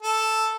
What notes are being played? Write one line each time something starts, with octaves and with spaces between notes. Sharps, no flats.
A4